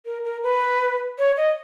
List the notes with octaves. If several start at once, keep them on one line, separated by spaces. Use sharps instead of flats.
A#4
A#4
B4
C#5
D#5